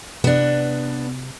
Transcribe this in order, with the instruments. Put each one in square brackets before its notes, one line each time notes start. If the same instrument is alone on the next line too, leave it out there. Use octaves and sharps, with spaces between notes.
[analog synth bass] C3 [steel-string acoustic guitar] B3 D4